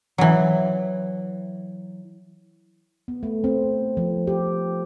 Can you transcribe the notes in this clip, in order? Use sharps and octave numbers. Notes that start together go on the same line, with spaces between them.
E3 F#3
B3
A3
C4
F3
G4